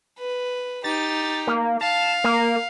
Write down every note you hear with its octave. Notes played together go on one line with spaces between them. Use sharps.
B4
D#4 G4 A6
A#3
F5 A5
A#3